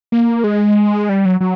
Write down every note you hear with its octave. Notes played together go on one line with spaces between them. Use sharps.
A#3
G#3
G3
F#3
F#3